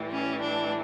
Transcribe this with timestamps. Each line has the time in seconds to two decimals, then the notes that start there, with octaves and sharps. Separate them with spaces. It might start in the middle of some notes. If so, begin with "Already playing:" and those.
Already playing: A2 E3 G3
0.11 C#4
0.42 D4